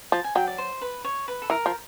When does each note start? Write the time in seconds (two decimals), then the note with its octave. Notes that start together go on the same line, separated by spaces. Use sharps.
0.12 F3 A5
0.24 G#5
0.35 F#3 G5
0.47 D5
0.58 C5
0.82 B4
1.05 C#5
1.28 B4
1.42 A4
1.50 E3 A#4
1.66 F3